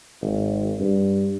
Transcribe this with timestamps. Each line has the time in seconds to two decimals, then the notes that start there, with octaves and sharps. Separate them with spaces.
0.22 G#1
0.80 G2